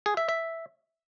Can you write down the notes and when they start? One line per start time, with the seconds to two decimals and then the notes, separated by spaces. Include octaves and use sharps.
0.06 G#4
0.17 E5
0.29 E5